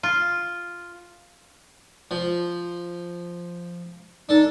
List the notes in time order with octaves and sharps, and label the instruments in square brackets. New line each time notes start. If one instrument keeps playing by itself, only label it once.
[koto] F4
[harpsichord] F3
[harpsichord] D4 A4 [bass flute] D#4